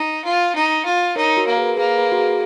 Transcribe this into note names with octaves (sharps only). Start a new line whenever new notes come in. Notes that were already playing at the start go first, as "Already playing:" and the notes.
Already playing: D#4
F4
D#4
F4
D#4 A#4 C#5
F#4 A#4
A#3
G#4 B4
A#3 G#4 B4
G#4 B4
F#4
G#4
F#4